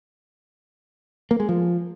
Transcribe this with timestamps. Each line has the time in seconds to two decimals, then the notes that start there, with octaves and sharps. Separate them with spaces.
1.31 A#3
1.40 G#3
1.49 F3